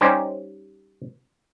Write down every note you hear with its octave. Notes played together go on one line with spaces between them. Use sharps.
G3 C#4 D#4 G4 C5